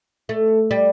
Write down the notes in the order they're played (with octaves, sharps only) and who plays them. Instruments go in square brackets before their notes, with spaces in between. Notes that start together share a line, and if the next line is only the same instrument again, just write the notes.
[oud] A3
G3